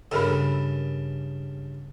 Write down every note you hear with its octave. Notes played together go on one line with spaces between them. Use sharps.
G2 C#3 A4 A#4 B5